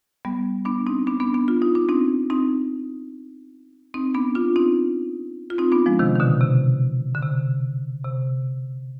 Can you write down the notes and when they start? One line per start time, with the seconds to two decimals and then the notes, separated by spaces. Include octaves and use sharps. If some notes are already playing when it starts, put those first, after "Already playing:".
0.25 G3 B3
0.65 B3 D4
0.87 C4 D#4
1.07 B3 D4
1.20 B3 D4
1.34 B3 D4
1.48 F4
1.62 D#4
1.75 D4
1.89 C4 D#4
2.30 C4 D#4
3.94 C4 D#4
4.14 B3 D4
4.35 D4 F4
4.56 C4 D#4
5.50 F4
5.58 C4 D#4
5.72 B3 D4
5.86 F3 G#3
5.99 C3 D#3
6.15 D#3
6.20 B2 D3
6.41 C3
7.15 D3
7.23 C3
8.05 C3